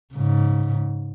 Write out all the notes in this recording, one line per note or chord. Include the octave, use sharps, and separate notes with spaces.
G#2 C#3